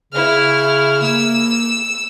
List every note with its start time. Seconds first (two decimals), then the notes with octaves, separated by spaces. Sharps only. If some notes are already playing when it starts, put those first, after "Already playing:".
0.13 C#3 E4 F6
1.02 A#3 E6